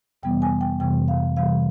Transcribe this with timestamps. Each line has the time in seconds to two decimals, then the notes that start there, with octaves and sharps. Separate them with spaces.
0.23 F2 C3 E3 G3 B3 G5
0.42 G#5
0.61 G5
0.80 F2 C3 E3 G3 B3 G5
1.08 F5
1.37 C3 E3 G3 F5